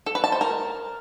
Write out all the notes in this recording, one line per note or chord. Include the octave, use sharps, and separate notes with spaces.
A4
B4
A5
C5
A#4